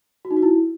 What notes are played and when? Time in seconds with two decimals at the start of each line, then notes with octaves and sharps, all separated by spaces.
0.25 F#4
0.31 D#4
0.37 F#4
0.42 E4